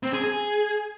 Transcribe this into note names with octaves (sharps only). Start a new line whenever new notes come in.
C4
G#4
G#4